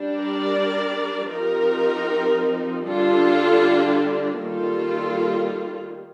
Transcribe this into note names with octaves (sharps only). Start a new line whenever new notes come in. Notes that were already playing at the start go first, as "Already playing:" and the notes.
Already playing: G3 D4
A#4 D5
F3 C4 D#4 G4 A#4
D3 G3 D4 F4 A4
D#3 G3 A#3 F4 A4